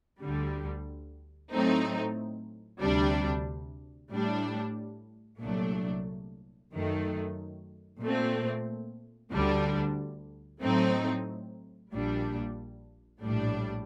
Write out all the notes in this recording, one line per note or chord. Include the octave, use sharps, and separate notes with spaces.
D2 D3 G3
A2 F#3 A3 C4 D#4
D2 C3 G3 D4
A2 G3 D4
C2 A#2 F#3 A3 D4
F#2 D#3 A3
A#2 A3 C4
D2 D3 G3 D4
A2 F#3 A3 C4 D#4
A#1 A#2 G3 D4
A#1 A2 G3 D4